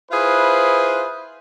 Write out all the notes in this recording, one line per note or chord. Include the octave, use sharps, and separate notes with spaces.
E4 F4 G#4 B4 C5